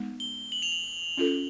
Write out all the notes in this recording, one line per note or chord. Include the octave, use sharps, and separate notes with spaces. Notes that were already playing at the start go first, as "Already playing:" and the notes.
Already playing: G#3 B3 D#4
G7
F#7
F7
F#7
C#4 F4 A4